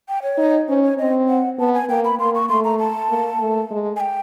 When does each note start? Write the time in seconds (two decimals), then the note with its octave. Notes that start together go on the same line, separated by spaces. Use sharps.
0.08 G5
0.22 C#5
0.38 D#4
0.68 C#4 C5
0.83 C#5
0.98 C4 D#5
1.29 F#5
1.59 B3 A5
1.74 G#5
1.89 A#3 G5
2.04 B5
2.19 A#3 C6
2.35 C#6
2.49 A3 C6
2.64 A#5
2.79 A5
3.09 A#3
3.40 A3
3.71 G#3
3.96 G#5
4.00 G5